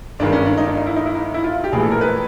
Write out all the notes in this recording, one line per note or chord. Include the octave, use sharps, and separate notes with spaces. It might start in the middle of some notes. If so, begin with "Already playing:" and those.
G1 G2 D#3 G#3 D4
C#4
D4
D#4
D4
D#4
E4
D#4
E4
D#4
E4
F4
G4
A#1 A2 E3 G#3 G#4
A4
A#4
B4